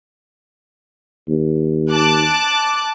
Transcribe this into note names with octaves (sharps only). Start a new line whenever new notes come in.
D#2
A5 D6 F#6